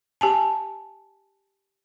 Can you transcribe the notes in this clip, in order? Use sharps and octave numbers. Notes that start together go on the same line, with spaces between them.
G4 G#5 A5